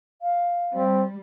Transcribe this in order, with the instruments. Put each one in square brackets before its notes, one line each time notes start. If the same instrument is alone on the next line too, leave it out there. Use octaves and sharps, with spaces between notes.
[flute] F5
[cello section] G3 [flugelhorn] C4